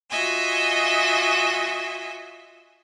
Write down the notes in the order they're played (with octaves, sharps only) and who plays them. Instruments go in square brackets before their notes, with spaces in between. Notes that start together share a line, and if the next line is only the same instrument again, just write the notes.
[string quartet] F4 F#4 D#5 E5 G#5